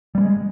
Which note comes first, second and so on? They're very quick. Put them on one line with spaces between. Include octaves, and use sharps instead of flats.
G3 B3 G#3